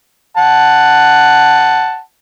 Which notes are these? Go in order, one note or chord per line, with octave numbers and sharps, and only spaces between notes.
F#5 A5